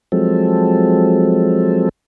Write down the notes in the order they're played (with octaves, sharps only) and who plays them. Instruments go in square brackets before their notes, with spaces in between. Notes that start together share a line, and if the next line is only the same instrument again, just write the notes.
[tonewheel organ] F3 F#3 G#3 C4 A4